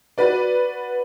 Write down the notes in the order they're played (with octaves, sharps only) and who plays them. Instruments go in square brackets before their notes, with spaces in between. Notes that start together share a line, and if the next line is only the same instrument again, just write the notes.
[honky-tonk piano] F#4 B4 D5